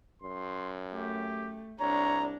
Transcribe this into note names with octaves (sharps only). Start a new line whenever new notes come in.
F#2 C6
A3 G4
C2 D4 C#5 A#5